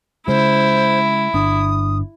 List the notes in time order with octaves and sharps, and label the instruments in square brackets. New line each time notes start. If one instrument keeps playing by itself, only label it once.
[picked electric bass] C#3 G#3 [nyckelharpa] E4 [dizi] C5
[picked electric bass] G1 D4 [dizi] D#6